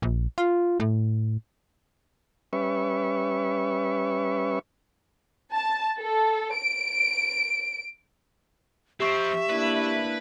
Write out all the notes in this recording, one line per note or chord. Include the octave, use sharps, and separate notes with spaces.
A#1
F4
A2
G3 C#4 B4 E5 C#6
A5
A4
D7
F3 C4 G4 E5 C#6
A#3 D4 E4 B4